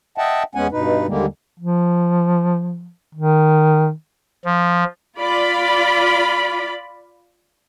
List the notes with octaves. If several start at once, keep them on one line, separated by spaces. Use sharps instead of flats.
D#5 E5 F#5 G5 A5
E2 G#3 B3 C#4 F#5 G#5
G2 B2 D#4 B4
D#2 D3 G3 G#3 A#3
F3
D#3
F3
F4 D5 B5